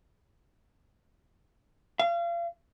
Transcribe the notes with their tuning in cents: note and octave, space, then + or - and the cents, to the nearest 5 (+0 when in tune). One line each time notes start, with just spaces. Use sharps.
F5 -35